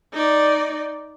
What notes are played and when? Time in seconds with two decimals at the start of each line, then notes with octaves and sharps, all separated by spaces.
0.13 D#4 D5